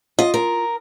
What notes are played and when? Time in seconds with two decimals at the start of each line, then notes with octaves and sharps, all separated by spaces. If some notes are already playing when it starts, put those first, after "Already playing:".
0.19 F4 D#5
0.34 A#4